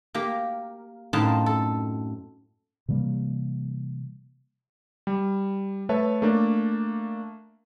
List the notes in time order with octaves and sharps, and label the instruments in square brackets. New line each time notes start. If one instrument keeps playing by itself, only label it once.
[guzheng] A#3 G4 A#4
F#2 A2 C4 D#4 F5 A5
A4
[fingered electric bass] C3 E3 G3 A#3
[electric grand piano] G3
A3 B4 C#5 E5 A5
A3 A#3 D4